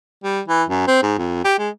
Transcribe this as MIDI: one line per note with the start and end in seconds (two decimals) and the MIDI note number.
0.24 0.41 55
0.48 0.63 52
0.69 0.84 42
0.87 1.03 60
1.03 1.17 44
1.18 1.44 41
1.44 1.54 67
1.58 1.69 56